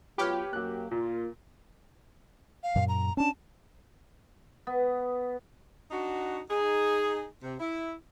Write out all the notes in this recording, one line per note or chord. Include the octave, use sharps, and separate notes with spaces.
F#3 B3 F4 G4 B4 C#5 F6
F#2 F#3 A#3 F#6
A#2 A#3 F4
F5
F#2 A#2
A#5
C#4 D4 A5
B3
D4 D#4 F#4
D#4 G#4
C3
E4